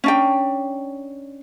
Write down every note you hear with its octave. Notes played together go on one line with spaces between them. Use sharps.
C#4 D4 G5